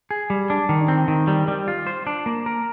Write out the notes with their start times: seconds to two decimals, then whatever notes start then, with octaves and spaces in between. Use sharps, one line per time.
0.11 G#4
0.30 G3
0.50 D4
0.69 D#3
0.88 C4
1.08 D#3
1.27 G3
1.48 G3
1.68 F4
1.87 C5
2.07 D4
2.26 A#3
2.46 A#4